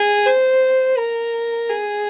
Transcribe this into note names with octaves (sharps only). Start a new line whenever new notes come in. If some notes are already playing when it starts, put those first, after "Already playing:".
Already playing: G#4
C5
A#4
G#4